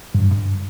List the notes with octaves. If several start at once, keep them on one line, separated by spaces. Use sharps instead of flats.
G2